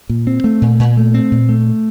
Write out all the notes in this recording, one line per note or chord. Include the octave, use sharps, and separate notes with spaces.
A#2
C4
A3
A#2
A#2
A3
C4
A#2
A3